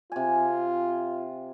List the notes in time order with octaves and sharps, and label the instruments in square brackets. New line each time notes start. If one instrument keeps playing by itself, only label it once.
[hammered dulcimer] C3 G#5 [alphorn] F4